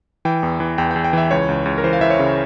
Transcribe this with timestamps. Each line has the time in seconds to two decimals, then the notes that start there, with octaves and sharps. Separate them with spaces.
0.25 E3 G5
0.43 E2
0.60 E3
0.78 E2 G5
0.91 G5
0.96 E2
1.04 G5
1.13 E3 E5
1.31 C#2 C#5
1.48 C#2
1.65 C#2
1.78 A#4
1.84 E3 C5
1.93 F5
2.01 E3 E5
2.10 C#5
2.19 C#3